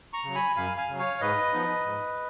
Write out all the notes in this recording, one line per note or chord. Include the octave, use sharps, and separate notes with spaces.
A#5 C#6
C#3 F#3
G#5 B5
F#2 F5 G#5
F5 G#5
C#3 F#3
C#5 F5
G#2 B4 D#5
F3 B3 D#4
G#2